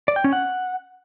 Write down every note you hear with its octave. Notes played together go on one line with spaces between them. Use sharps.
D5
G5
C#4
F#5